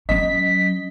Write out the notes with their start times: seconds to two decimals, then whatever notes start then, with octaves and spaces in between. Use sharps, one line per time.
0.09 F#3 C#4 D#5 B6